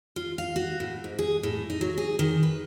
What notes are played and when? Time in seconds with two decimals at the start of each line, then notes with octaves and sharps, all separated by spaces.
0.16 F4
0.38 F5
0.56 F#4
0.80 A2
1.04 G#2
1.19 G#4
1.43 A2
1.70 D#4
1.81 F#3
1.98 G#4
2.19 D#3
2.43 B4